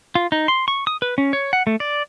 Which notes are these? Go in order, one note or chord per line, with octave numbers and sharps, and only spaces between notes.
F4
D#4
C6
C#6
D#6
B4
C#4
C#5
F#5
A3
D5